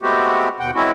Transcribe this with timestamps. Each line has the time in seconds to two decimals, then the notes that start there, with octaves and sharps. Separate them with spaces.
0.02 G#3 A3 B3 C4 F#4 G4
0.60 D#2 B2 F#5 G5
0.75 E3 G#3 C4 C#4 E4 F#4